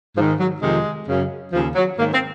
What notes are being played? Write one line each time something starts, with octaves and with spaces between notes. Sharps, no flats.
G#2 D#3 F3
F#3
F2 C3 D#3 G#3
F#2 C#3
D#2 C#3 F3
F#3
G#2 D#3 A#3
C4